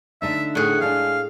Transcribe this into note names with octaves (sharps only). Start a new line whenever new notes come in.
D3 A3 D#4 E5
A2 G#4 F#5
G#3 D4 F5